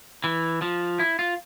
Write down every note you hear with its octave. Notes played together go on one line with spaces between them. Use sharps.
E3
F3
E4
F4